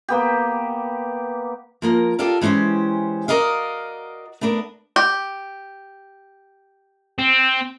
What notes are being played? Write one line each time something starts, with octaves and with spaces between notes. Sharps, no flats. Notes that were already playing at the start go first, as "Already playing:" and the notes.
A#3 B3 G4
F3 A#3 A#4
F4 G4 A4 A#4 D5 F5
E3 G#3 C#4 G4 C5
F#4 A#4 D5 D#5 F5
A3 B3 D4 A#4
G4
C4